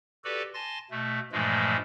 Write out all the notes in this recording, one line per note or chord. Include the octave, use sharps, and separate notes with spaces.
F#4 G4 A4 B4 D5
G#5 A5 C6 A6 A#6
B2 A3
G2 A#2 E3 F3 G#3 A3